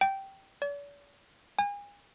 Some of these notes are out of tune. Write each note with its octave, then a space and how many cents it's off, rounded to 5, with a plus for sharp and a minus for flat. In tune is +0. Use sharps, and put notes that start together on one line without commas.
G5 -10
D5 -45
G#5 -35